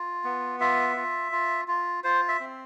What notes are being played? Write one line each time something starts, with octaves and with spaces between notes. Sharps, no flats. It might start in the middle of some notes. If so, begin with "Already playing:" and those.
Already playing: F4
B3
F4 E5
F4
F4
F4
F4 C5
E5
C4